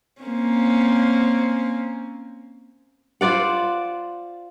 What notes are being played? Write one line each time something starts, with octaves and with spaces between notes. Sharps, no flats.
A#3 C4 C#4
F4 C5 D5 F#5